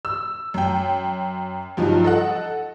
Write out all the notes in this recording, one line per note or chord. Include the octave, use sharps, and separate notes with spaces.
E6
F#2 G5
G2 F3 F#3 D#4
A4 D#5 F#5